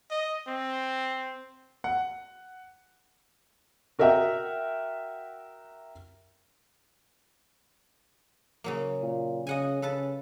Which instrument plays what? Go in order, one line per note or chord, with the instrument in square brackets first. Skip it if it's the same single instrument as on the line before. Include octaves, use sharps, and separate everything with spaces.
[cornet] D#5
C4
[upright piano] F#5
[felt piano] F#4 A#4 D#5 E5 F#5 G5
[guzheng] C#3 F#3 A#3
[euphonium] A#2
[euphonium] C#3 [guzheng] D#5 F#5 G#5
[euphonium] C#3 [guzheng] A4 B4 A5